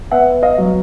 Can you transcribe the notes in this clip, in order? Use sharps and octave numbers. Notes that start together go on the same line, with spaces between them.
B3 E5 F#5
D#5 F5
F#3